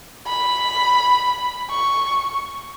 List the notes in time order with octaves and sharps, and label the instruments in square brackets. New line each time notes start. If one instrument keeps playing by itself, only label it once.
[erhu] B5
C#6